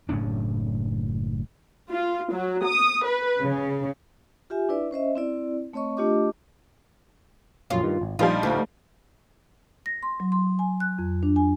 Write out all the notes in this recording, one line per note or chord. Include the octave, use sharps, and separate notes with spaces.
F#1 A2 C#4 D4
F4
F#3
D#6
B4
C#3
F4 G4 E5 G#5
D4 E4 B4 D5 E5
C#4 C5 D#5 E5
C4 E4 D5
A3 C4 C#5 D#5 C#6
A3 D4 F4 G4 D#5 D6
A#1 F#2 C#4 F4
G2 D#3
G#1
A#1 F3 G3 D4 D#4 F4
D2
A#6
C6
F#3
C6
G#5
F#6
F2
D4
G#5